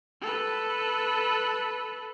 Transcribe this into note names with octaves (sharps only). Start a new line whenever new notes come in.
A4 B4